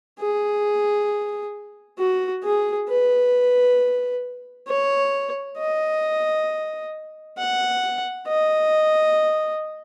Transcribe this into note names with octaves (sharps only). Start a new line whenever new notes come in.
G#4
F#4
G#4
B4
C#5
D#5
F#5
D#5